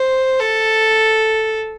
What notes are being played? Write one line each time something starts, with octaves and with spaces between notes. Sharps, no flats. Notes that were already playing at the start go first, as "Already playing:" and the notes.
Already playing: C5
A4